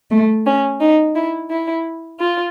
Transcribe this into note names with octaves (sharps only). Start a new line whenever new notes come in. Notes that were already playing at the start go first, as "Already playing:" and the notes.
A3
C#4
D#4
E4
E4
F4